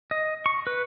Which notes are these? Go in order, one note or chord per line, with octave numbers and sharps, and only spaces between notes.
D#5
C#6
B4